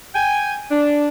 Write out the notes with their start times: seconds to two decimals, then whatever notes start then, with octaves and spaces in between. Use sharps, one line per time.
0.14 G5 G#5
0.70 D4